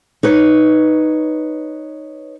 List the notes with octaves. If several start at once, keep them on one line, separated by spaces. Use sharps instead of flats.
D#4 B4 C#5